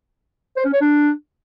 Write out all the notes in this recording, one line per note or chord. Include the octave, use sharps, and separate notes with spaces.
C5
C#4
C#5
D4